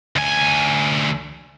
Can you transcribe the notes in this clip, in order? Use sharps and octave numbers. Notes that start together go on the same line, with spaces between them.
D2 G#5